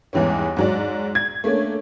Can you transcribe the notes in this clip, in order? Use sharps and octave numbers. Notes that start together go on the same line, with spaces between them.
E2 G#2 E3 G3 C#4
G#2 F#3 D5
G#6
A3 A#3 C#4 D4